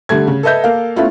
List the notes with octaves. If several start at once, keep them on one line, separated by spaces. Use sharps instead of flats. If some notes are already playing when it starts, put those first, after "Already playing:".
D3 G3 A3 G#6
C#3
A4 B4 D#5 E5 G6
A#3 A4 F5
A3 B3 C#4 E4 F4